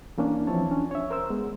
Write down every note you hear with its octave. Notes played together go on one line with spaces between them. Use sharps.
E3 A#3 C#4 D4
E3 F3 C4 E4 C#5 A5
C#4 D4
C#5 E5
A#4 C5 E6
G#3 B3